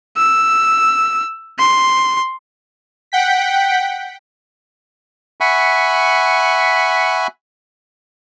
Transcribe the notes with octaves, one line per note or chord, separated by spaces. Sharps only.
E6
C6
F#5 G5 B6
E5 F#5 G#5 B5 C#6